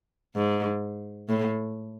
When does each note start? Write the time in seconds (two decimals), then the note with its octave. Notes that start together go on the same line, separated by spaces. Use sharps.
0.36 G#2
1.29 A2